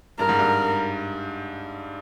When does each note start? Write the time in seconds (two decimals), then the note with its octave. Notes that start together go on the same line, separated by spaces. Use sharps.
0.19 G2 A#4
0.29 G#2
0.39 G2